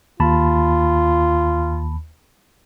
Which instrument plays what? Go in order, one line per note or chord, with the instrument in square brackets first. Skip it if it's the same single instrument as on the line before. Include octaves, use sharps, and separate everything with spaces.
[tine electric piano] D#2 A5 B5 [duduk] F4